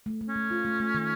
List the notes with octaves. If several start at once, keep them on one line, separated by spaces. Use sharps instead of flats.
A3
A3
C#4
A3
F4
A3
A3
D#3